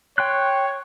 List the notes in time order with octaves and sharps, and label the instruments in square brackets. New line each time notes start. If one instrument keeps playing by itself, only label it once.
[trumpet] C#5 [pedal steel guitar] G5 C6 F#6